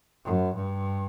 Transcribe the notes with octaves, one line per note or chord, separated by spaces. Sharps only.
F#2
G2